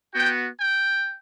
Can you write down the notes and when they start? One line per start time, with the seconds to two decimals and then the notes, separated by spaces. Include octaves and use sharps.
0.15 B3 F#4 G5
0.60 G5